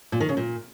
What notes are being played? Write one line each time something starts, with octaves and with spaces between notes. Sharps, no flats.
A#2
D#3
C#3
A#2